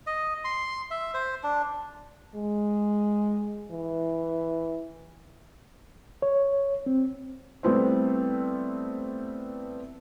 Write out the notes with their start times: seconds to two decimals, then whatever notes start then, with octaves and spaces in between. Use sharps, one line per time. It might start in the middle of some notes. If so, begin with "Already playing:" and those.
0.07 D#5
0.44 C6
0.91 E5
1.14 C5
1.43 D4
2.35 G#3
3.72 E3
6.22 C#5
6.86 C4
7.63 G3 A3 B3 C4 E4 C5